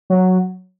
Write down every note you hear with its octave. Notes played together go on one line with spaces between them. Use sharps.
F#3